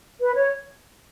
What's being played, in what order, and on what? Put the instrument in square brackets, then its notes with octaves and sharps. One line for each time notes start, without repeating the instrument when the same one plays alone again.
[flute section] B4
C#5